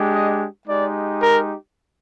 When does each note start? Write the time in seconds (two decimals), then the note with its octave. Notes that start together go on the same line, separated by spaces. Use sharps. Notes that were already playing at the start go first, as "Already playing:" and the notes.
Already playing: G#3 D4 G4
0.13 D#5
0.67 G#3 D#4 G4 D5
1.22 A#4